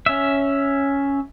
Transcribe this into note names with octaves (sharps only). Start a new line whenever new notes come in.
C#4 E5